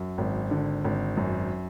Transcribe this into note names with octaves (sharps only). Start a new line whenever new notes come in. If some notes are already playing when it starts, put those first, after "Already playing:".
Already playing: F#2
G#1
D3
G#1
F#2